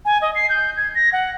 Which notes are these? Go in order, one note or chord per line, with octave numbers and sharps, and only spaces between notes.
G#5
D#5
C7
G6
G#6
A#6
F#5